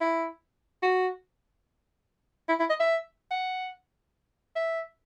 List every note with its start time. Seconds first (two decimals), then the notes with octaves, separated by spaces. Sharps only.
0.01 E4
0.83 F#4
2.49 E4
2.60 E4
2.70 D#5
2.80 E5
3.31 F#5
4.56 E5